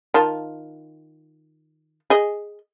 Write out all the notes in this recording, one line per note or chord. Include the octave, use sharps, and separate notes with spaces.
D#3 F4 A5
G#4 D#5